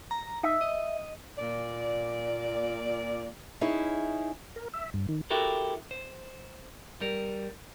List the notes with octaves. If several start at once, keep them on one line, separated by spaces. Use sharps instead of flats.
A#5
D#4 E5
D#5
A#2 D5
C#4 D#4 E4 G#4
A#4
E5
G2
D#3
E4 F#4 G4 A4 A#4
C5
G3 A#4